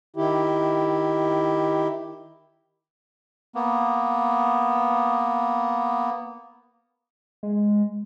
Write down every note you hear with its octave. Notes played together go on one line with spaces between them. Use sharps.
D#3 E4 G4
A#3 B3
G#3